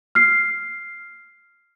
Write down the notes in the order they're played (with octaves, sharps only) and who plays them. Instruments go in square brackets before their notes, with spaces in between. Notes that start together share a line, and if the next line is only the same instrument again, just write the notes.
[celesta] F6 C7